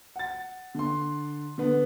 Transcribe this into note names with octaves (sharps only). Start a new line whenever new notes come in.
F#5 A6
D3 C6
D3 B3